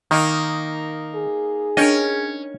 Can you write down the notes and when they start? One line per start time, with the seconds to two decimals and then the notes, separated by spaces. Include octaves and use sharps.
0.11 D#3 A#3 D#4
1.15 G#4
1.77 C#4 D4 A#4 D#5 G5